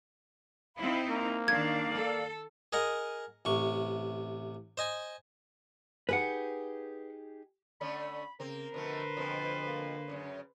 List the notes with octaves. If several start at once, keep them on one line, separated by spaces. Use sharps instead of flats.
C4 D#4 E4 F5 B5
A#3 A#5
D#3 D4 D5 F5 G#6
A4
G#4 A#4 D#5 F#5
A1 C3 C#6
C5 D#5 G#5
D#4 G4 G#4 B4 F#5
D3 A3 C#4 B5
C#3 A#3 C4 A#4
B2 D3 F3 A3 B4 C5
F2 B2 F3
A#3
F#2 A2 C#3